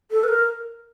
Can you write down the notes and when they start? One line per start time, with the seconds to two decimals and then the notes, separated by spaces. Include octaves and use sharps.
0.11 A4
0.24 B4
0.28 A#4